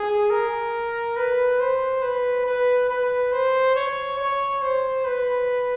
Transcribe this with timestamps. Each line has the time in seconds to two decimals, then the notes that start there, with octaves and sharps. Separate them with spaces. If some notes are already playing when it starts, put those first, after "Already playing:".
Already playing: G#4
0.30 A#4
1.17 B4
1.60 C5
2.02 B4
2.46 B4
2.90 B4
3.32 C5
3.76 C#5
4.19 C#5
4.62 C5
5.05 B4